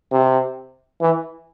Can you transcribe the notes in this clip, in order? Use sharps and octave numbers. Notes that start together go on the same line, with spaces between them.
C3
E3